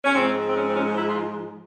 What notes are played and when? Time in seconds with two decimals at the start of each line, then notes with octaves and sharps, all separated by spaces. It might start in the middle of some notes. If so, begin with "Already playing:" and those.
0.04 C#4
0.14 G#2 F3 G#3 C4
0.49 C4
0.56 C#4
0.68 C4
0.75 C#4
0.96 E4
1.07 F4